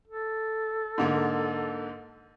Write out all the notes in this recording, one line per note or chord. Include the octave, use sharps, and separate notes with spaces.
A4
G#2 D3 A#3